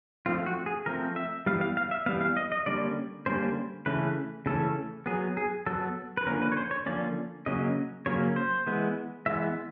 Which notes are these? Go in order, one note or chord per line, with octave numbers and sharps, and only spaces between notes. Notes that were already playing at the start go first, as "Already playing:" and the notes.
F3 A3 C4 F4
F#4
G#4
F3 A3 C4 A#4
E5
E3 G3 B3 F5
F5
F5
E5
E3 G3 B3 F5
F5
D#5
D#5
D3 G3 A#3 C#4 D5
D3 G3 A#3 C#4 C5
C#3 E3 A3 C#4 B4
C#3 E3 A3 C#4 A4
F#3 B3 G#4
G#4
F#3 B3 A4
B4
D3 F3 A#3 C#4 A#4
B4
C#5
C5
C#5
D3 F3 A#3 C#4 D5
C#3 F#3 A#3 C#4 D#5
C#3 F#3 A#3 C#4 C#5
C5
E3 G#3 B3
E3 G#3 B3 E5